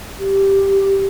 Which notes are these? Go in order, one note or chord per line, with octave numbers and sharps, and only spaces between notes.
G4